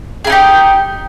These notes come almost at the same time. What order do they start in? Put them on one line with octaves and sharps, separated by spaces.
G#4 E4 D#4 G4